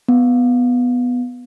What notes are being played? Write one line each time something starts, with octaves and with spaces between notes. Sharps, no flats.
B3